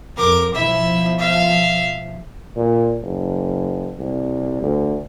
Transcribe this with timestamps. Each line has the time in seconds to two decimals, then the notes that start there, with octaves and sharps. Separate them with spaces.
0.17 F2 A#4 D6
0.53 B2 F3 E4 E5
1.19 E5 F5
2.56 A#2
3.03 F#1
3.99 C2
4.62 D2